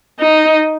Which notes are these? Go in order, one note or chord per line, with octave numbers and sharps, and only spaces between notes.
D#4